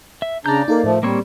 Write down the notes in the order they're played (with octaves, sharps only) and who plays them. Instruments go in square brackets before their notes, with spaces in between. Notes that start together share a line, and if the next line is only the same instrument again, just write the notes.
[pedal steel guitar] E5
[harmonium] C#3 D4 A#5 [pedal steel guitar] D5 G6
[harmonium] A#3 [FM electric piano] D#4 A4 A#4
[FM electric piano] A2 [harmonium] F3 A3
[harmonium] G3 [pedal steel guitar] A#3 C4 C#5